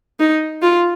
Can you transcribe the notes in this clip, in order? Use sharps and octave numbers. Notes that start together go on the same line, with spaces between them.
D#4
F4